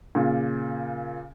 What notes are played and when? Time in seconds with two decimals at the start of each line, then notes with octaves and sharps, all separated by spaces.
0.15 A#2 C#3